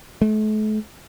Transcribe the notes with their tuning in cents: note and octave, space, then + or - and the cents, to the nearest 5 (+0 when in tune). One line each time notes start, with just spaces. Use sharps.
A3 -40